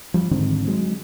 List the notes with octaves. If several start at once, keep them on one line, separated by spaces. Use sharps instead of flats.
F3 G3
G#2 D3 D#3 C4
F#3 G#3